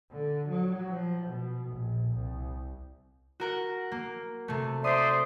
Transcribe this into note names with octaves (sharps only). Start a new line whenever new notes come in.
D3
F#3
F3
B2
A#1
C2
F#4 A#4 F#5
A#3
C3 A3
C5 D5 E5 C6 D#6